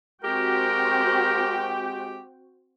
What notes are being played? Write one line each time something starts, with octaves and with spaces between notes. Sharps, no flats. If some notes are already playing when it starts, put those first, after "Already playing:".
G#3 C4 F#4 G4 A#4 G5